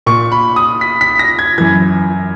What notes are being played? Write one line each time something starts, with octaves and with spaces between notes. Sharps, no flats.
A#2 C#6
B5
D#6
B6
B6
A#6
G#6
F#2 E3 G#6